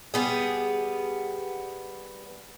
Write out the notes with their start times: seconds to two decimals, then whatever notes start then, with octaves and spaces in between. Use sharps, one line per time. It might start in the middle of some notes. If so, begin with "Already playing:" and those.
0.14 G3 B3 G#4